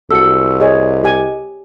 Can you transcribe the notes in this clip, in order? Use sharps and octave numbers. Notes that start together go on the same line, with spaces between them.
C2 F#4 A4 E6 C#7
G#4 C#5 D#5
G4 G#5